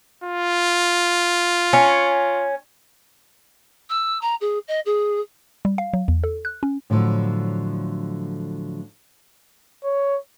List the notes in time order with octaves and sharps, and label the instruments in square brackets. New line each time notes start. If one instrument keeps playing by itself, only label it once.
[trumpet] F4
[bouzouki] C#4
[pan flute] E6
A#5
G#4
D#5
G#4
[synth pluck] G3
F5
F#3
E2
A4
F#6
C#4
[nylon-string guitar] A2 D3 F3 F#3
[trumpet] C#5